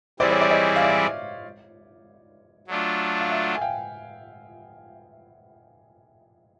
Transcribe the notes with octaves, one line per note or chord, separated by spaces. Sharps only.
E3 G3 C4 E4 G#4 C5 D5
C#5
D5
C#5 D#5
F5
D5 E5
F#3 A3 D4 F4
F5
E5 F#5
G#5
F5 G5